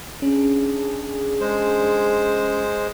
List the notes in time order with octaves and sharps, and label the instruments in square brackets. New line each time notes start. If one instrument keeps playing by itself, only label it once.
[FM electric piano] C#4 [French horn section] D4 G#4
[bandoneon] G#3 C5